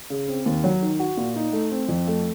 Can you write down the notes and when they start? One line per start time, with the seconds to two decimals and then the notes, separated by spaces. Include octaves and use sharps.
0.10 C#3
0.28 C4
0.46 D#2
0.64 F#3
0.82 D#3
0.99 F#4
1.17 A#2
1.36 D#4
1.53 A3
1.71 C4
1.88 F2
2.07 A3